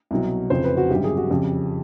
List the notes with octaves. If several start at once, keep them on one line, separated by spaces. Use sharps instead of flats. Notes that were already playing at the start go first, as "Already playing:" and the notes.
C2 B2 F#3
F1 F2 C#3 F3 C5
B4
F#4
G#1 F#2 D3 G3 G4
G#4
F#4
F2 C#3 F3 G4